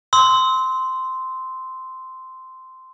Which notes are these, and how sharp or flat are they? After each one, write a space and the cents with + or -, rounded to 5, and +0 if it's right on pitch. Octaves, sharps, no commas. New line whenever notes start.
C6 -10 E6 -35